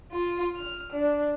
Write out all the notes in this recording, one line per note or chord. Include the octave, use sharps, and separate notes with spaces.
F4
F6
D4